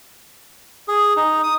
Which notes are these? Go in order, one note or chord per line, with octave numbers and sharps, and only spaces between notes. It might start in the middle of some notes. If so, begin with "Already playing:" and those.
G#4
D#4
D#6